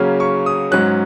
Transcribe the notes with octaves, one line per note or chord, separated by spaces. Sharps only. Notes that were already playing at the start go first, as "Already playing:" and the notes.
Already playing: C#3 F#3 A#3 C#4
C#6
D#6
G#2 F#3 C#4 F#6